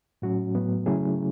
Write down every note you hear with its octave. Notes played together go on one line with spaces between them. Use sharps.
A2 F#3 C#4 F#4
A2 F#3 B3
C#3 F#3 A3 C#4 E4 G#4